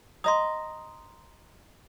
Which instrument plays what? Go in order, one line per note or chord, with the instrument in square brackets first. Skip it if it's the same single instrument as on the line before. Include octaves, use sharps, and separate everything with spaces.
[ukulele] D#5 A#5 [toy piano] C6 D#6